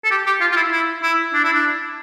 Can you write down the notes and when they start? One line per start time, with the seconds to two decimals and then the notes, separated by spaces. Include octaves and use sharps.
0.04 A4
0.11 G4
0.26 G4
0.41 F4
0.52 F4
0.56 E4
0.72 E4
1.03 E4
1.34 D4
1.44 E4
1.53 D4